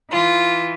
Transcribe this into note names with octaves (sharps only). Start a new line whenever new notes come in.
E3 F4